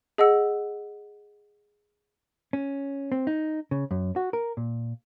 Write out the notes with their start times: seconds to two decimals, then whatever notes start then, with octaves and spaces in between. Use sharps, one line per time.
0.18 G#4 D#5 F#5 E6
2.53 C#4
3.12 C4
3.27 D#4
3.71 C#3
3.91 F#2
4.16 F#4
4.33 A#4
4.57 A#2